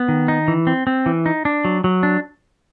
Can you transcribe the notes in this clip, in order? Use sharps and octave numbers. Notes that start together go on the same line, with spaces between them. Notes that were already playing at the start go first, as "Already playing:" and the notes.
Already playing: B3
D#3
D#4
E3
C4
C4
E3
D#4
D4
F#3
F#3
D4